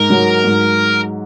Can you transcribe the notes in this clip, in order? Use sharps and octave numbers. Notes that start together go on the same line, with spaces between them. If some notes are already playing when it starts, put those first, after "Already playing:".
Already playing: G#2 A#4
F#3
G#2